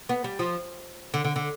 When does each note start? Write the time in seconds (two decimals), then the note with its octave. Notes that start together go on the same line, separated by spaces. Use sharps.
0.09 B3
0.24 G3
0.39 F3
1.14 D3
1.24 D3
1.36 D3